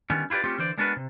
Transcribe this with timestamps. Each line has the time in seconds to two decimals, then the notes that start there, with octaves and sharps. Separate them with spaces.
0.10 D3 D#3 G3 B3 C#4
0.30 E4 F4 G4 B4 D5
0.44 A3 C4 C#4 F4 G4
0.58 D3 E3 C5 D5
0.77 G#3 B3 D4 F#4 A#4 B4
0.97 C3